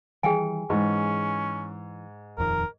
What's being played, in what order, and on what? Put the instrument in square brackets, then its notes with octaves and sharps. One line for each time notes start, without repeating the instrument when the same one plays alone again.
[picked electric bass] D#3 E3 G3 [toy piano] G#4 G5 G#5
[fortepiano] G#2 [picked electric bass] E3 [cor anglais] C#4
[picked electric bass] D#1 F2 D#3 [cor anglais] A#4